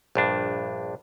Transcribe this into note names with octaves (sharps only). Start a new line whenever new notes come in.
A#1 G2 D4